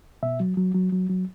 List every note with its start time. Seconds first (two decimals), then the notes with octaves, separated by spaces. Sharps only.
0.23 B2 E5
0.40 F#3
0.57 F#3
0.75 F#3
0.92 F#3
1.10 F#3